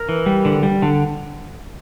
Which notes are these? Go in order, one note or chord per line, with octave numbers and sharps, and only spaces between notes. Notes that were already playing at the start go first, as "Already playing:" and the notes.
Already playing: A#4
E3
G3
D3
G3
D3